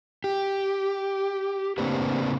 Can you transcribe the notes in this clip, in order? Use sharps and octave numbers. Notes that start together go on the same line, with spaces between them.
G4
A2 C#3 A#3 C4 D4 B4